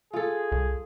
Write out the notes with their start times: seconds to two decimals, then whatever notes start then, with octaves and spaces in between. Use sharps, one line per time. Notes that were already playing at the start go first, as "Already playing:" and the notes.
0.13 F4 G#4 A4
0.52 C2